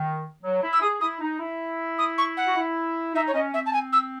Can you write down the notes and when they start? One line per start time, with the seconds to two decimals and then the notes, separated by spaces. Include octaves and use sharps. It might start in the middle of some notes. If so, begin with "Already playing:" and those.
Already playing: D#3
0.43 F#3
0.62 E4
0.73 E6
0.81 G#4 D#6
1.01 E4 D#6
1.20 D#4
1.40 E4
1.98 D#6
2.18 C#6
2.37 F#5
2.47 F#4
2.56 E4
3.15 D#4 E5
3.27 C#5
3.34 C#4 D#5
3.54 C4 E5
3.66 A5
3.73 G#5
3.93 E6